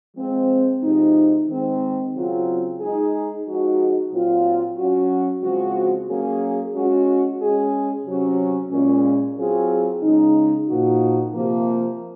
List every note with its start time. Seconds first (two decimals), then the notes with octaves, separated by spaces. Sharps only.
0.17 F3 G#3 C4
0.83 C3 F3 G#3 D#4
1.48 D#3 G#3 C4
2.15 C#3 F#3 C4 F4
2.81 G#3 D#4 G#4
3.46 F3 G#3 D#4 F#4
4.12 A#2 F#3 C4 F4
4.77 F#3 C#4 F#4
5.43 C#3 F3 G#3 C4 F#4
6.09 F#3 A#3 C#4 G#4
6.75 G#3 C#4 F#4
7.41 G#3 C#4 G#4
8.06 C3 F#3 C#4 F#4
8.71 A#2 G#3 C#4
9.38 F#3 C4 F4 G#4
10.03 C#3 G#3 D#4
10.68 A#2 F3 A#3 D#4 F#4
11.35 C3 F3 A#3